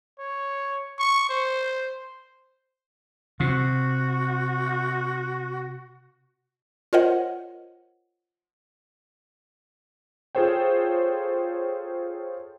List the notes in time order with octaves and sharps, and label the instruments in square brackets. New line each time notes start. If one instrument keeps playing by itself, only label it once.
[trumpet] C#5
C#6
C5
[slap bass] C3 [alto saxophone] F#4
[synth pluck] F4 A#4 C5 C#5 D#5 F#5
[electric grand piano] F4 G#4 A4 C5 C#5 G5